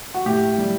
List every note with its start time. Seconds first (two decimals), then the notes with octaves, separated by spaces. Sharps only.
0.14 F#4
0.26 A2 G4
0.58 G3